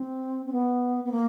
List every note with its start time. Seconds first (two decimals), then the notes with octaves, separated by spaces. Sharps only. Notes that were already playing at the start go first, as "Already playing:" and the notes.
Already playing: C4
0.46 C4
0.52 B3
1.04 B3
1.11 A#3